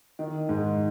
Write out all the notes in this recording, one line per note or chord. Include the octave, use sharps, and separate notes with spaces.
D#3
G#2